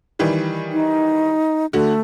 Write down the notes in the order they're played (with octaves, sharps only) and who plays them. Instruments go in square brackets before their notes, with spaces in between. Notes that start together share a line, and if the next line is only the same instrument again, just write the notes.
[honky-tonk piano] D#3 E3 G3
[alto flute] D#4
[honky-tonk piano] D3 F#4 [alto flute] A3